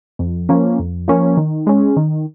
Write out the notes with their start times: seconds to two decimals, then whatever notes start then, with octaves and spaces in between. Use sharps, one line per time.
0.19 F2
0.49 F3 A#3 C#4
0.79 F2
1.08 F3 A#3 C#4
1.37 D#3
1.67 G#3 C#4
1.96 D#3